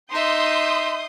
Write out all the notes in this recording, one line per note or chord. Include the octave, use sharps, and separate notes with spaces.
D#4 E5 C6 D#6 G6